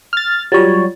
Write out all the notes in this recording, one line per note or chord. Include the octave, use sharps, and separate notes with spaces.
F6 A6
F#3 G3 F4 C#5 A6